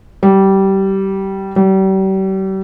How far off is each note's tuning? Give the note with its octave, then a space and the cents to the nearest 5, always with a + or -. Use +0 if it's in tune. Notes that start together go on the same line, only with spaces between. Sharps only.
G3 -20
G3 -40